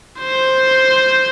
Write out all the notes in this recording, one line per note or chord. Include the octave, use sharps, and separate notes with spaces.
C5